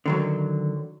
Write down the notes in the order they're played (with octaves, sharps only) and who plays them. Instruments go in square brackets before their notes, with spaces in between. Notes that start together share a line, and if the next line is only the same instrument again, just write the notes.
[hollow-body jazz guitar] D3 D#3 F#3